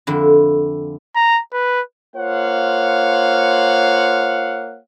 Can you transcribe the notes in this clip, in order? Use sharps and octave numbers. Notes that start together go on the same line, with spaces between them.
F2 D3 E4
A#5
B4
A#3 F4 C5 C#5 F5 F#5